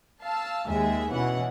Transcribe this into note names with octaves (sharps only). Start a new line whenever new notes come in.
F5 A5 E6
D#2 G#3 G#4 E5
B2 E3 C#4 F#5